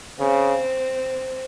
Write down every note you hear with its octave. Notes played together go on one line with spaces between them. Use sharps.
C#3 C4